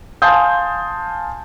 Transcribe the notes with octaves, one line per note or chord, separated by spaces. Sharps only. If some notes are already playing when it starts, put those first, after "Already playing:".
F5 G#5 A5 C6 D#6 G6